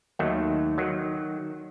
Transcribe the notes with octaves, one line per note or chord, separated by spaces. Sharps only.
D#2 D#3 F#3 A3
D#3 F#3